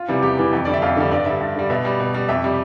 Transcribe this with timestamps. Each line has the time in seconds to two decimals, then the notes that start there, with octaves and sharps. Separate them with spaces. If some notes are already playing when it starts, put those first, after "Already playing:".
Already playing: F4
0.08 C3 E3 G3
0.22 E2 G4
0.38 C3 E3 G3
0.53 F2
0.65 D3 G3 D5
0.74 E5
0.82 F2 F5
0.97 D3 G3
1.11 G2 D5
1.26 D3 G3 E5
1.41 G2
1.56 D3 G3
1.70 B2 E5
1.85 G3
2.00 B2
2.15 G3
2.29 F2 E5
2.43 C3 G3